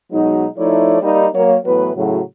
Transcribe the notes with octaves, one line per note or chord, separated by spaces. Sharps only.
B2 F#3 G#3 D#4
F3 A3 D#4 E4 C#5 D5
G3 A#3 D#4
F#3 A#3 C#5
A2 E3 F#3 B3 B4
A2 C#3 F#3